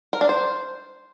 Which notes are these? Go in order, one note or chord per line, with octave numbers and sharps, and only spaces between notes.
A#4
D4
C5